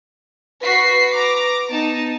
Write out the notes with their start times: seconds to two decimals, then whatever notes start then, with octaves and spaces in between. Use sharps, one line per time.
0.63 F#4 B4 B6 C7
1.11 A#5 D6
1.70 B3 D#4 A5